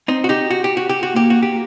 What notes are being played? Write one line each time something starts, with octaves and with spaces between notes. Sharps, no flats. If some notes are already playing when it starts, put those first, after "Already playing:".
C4 D#4
F#4
D#4 G4
F#4
G4
F#4
G4
F#4
A#3 G4
F#4
G4